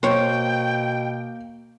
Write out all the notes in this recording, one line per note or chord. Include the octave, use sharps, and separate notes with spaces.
B2 A#3 C5 C#5 G5